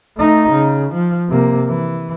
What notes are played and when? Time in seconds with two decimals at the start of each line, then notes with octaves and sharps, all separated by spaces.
0.18 A3 D#4
0.52 C#3
0.93 F3
1.29 C3 A#3
1.68 E3